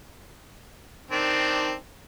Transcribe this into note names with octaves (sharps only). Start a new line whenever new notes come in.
D#3 C4 D4